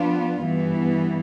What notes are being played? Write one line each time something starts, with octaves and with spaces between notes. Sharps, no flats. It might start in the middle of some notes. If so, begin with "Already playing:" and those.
Already playing: F3 B3 D4 F4
G2 E3 B3